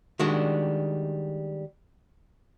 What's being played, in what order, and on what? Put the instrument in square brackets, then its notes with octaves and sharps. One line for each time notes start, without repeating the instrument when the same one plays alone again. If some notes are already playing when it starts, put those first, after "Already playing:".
[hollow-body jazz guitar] D#3 G3 G#3 D4 F#4